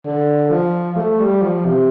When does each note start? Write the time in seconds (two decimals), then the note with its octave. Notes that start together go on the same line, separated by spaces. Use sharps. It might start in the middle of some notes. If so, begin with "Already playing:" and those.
0.05 D3
0.50 F3
0.96 A3
1.19 G3
1.42 F3
1.65 C3